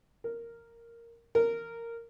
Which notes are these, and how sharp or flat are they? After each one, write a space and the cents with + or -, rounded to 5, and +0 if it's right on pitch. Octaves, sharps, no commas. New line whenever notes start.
A#4 -5
A#4 -10